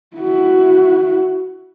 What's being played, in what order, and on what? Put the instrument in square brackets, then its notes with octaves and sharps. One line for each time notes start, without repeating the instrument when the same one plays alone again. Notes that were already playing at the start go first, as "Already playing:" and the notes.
[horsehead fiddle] E4 F#4